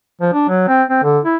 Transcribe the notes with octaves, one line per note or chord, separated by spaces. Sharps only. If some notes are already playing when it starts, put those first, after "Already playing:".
F3
D4
F#3
C4
C4
D3
E4